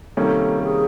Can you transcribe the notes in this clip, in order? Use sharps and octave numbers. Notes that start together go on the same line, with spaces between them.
C3 D#3 G3 A#3 C#4 A4
G#4